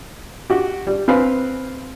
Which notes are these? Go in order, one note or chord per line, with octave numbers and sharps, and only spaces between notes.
F#4 G4
G3
C4 B4 F5 B5